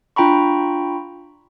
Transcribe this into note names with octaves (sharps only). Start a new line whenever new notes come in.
D4 F4 G5 A#5 B5 C#6